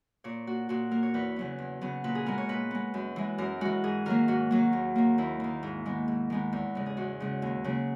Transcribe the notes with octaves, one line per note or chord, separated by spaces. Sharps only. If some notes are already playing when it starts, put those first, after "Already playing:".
A#2 C#5
A#3 F#4
A#2 F#4
A#3 A#4
C#5
E2 B4
C#3 F#3 B3
E2
C#3 F#3 B3
A#2 B4
G#4
G#3 B3 A#4
C#5
A#2 B4
G#3 B3
F#2
E3 G#3
F#2 A#4
E3 G#3 F#4
G#2 G#4
D#3 F#3 A#3 A#4
G#2 F#4
D#3 F#3 A#3
D#2
D#3 A#3
D#2 E4
D#3 A#3
G#2
D#3 G#3 B3
G#2
D#3 G#3 B3
E2
C#3 G#3
G#4
E2 F#4
C#3 G#3
D#2
C#3 F#3 A#3